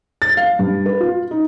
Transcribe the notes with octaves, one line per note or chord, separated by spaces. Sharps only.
A6
F5
G2
B4
F4
D#4